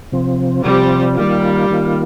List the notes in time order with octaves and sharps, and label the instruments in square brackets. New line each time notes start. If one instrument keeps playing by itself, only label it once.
[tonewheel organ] C3 F3 C4
[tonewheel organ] C3 F3 C4 [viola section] G3
[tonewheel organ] D#3 A#3 F4 [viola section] G3
[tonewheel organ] D#3 A#3 F4